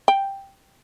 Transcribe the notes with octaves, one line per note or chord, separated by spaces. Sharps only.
G5